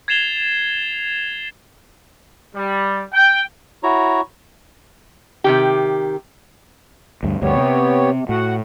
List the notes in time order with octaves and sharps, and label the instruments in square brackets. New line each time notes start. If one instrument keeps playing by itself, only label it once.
[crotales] G#6 A6 C7 E7 F7 G7
[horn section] G3
G5
[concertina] E4 F#4 C#5 A#5
[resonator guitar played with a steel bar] C3 D#3 G4
[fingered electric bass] D2 G2
[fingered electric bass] D2 G2 [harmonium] B3 G4 C#5
[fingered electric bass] C3
[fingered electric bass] A2 [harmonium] F#4 F#5